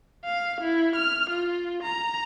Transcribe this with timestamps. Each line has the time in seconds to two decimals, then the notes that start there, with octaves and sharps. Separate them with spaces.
0.25 F5
0.61 E4
0.95 F6
1.30 F4
1.83 A#5